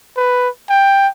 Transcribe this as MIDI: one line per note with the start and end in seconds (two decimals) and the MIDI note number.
0.17 0.49 71
0.69 1.08 79